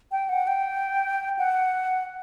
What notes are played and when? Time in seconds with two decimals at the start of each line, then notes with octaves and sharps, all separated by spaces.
0.12 G5
0.29 F#5
0.47 G5
1.39 F#5